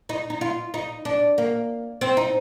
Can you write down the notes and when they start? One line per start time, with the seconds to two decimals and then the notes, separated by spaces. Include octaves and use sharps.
0.09 D#4
0.30 D#4
0.41 F4
0.74 D#4
1.05 D4
1.38 A#3
2.01 C4
2.17 D#4